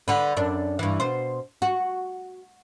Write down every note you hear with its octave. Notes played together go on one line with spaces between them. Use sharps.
D3 B4
F#2 D4
G2 E3
B2 C5
F#4